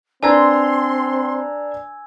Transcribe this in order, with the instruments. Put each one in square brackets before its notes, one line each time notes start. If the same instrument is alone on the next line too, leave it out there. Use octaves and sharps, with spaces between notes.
[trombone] C4 [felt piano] D4 B4 A#5 [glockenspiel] G#5 E6 G#6 [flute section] C6